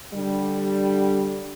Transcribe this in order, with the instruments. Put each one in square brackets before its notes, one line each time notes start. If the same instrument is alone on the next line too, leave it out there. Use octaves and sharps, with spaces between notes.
[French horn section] D3 G3